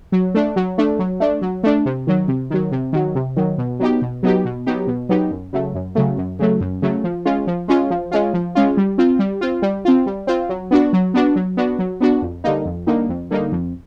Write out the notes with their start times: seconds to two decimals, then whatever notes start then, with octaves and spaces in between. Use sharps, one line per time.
0.12 F#3
0.35 A3 D4
0.56 F#3
0.78 A3 D4
0.99 F#3
1.20 A3 D4
1.42 F#3
1.63 A3 D4
1.85 C3
2.07 D#3 F#3
2.28 C3
2.50 D#3 F#3
2.72 C3
2.93 D#3 F#3
3.15 C3
3.36 D#3 F#3
3.58 B2
3.79 F#3 B3 D#4 G4
4.02 B2
4.23 F#3 B3 D#4 G4
4.45 B2
4.67 F#3 B3 D#4 G4
4.87 B2
5.09 F#3 B3 D#4 G4
5.31 F#2
5.53 C#3 F#3 A3
5.75 F#2
5.95 C#3 F#3 A3
6.18 F#2
6.39 C#3 F#3 A3
6.61 F#2
6.82 C#3 F#3 A3
7.04 F3
7.25 G#3 C#4 F4
7.47 F3
7.68 G#3 C#4 F4
7.90 F3
8.11 G#3 C#4 F4
8.34 F3
8.55 G#3 C#4 F4
8.77 G3
8.98 C4 F4
9.19 G3
9.41 C4 F4
9.62 G3
9.85 C4 F4
10.06 G3
10.27 C4 F4
10.49 F#3
10.71 B3 D4 F#4
10.93 F#3
11.14 B3 D4 F#4
11.36 F#3
11.57 B3 D4 F#4
11.79 F#3
12.01 B3 D4 F#4
12.22 F2
12.44 D3 G3 A#3 D#4
12.65 F2
12.87 D3 G3 A#3 D#4
13.09 F2
13.31 D3 G3 A#3 D#4
13.52 F2